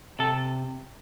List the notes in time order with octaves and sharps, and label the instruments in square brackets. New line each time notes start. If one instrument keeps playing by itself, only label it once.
[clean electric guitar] C3 A4